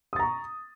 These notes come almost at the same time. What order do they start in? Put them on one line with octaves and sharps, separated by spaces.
D#6 A6 A#5 C#6